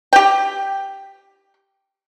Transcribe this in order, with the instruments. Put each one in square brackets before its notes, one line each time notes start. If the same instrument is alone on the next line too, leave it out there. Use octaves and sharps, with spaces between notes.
[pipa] G4 G5